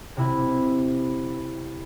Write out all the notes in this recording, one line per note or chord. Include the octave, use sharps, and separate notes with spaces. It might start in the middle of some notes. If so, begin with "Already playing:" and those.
C3 E4